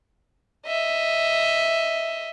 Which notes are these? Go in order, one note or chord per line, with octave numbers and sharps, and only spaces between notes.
D#5 E5